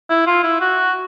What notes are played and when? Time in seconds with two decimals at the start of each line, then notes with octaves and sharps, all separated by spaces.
0.10 E4
0.27 F4
0.44 E4
0.61 F#4